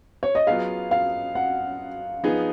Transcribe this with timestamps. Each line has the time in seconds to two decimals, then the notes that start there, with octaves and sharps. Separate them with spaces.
0.23 C#5
0.35 D#5
0.47 F#3 B3 F4 G#4 F5
0.91 F5
1.35 F#5
2.23 F3 B3 D#4 G#4